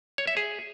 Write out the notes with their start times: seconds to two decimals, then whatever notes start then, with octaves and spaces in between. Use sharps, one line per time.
0.18 C#5
0.27 E5
0.37 G#4